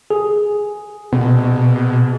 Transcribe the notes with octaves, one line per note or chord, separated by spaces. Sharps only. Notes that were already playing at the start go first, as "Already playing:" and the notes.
G#4
B2